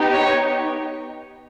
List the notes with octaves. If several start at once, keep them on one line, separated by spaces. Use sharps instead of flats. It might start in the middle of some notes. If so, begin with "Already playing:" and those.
Already playing: B3 D#4 G4
C#5